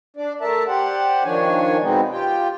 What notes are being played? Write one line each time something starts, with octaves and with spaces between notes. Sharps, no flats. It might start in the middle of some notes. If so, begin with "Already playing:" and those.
D4 D5
A3 A#4 E5 A5
G4 C5 D5 F#5
D#3 F3 D4 C#5 G#5
B2 G#3 B3 C4 D#4
F4 G4 G5